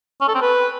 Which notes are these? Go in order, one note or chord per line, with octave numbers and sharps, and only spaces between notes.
C#4
A4
C4
B4